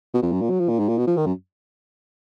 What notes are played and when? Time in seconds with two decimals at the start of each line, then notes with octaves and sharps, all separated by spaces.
0.14 B2
0.22 F2
0.32 F#2
0.41 A#2
0.50 F#3
0.60 F3
0.69 A#2
0.79 G#2
0.88 A#2
0.98 B2
1.07 F3
1.17 D#3
1.26 F#2